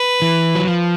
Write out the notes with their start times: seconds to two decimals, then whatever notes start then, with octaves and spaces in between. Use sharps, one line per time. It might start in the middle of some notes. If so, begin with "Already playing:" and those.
Already playing: B4
0.22 E3
0.55 F#3
0.67 F3